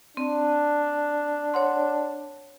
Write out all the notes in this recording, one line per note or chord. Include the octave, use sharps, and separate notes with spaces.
C4 D4
C#5 F#5 C6